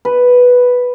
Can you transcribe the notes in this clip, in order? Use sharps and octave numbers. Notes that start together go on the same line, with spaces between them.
B4